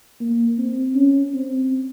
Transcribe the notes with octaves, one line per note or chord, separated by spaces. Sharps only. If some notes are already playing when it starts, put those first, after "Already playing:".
A#3
C4
C#4
C4